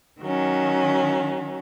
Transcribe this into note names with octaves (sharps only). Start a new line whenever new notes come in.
D#3 F#3 C#4